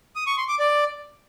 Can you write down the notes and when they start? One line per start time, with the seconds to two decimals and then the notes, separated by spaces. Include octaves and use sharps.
0.16 D#6
0.27 C#6
0.37 C6
0.48 D6
0.59 D5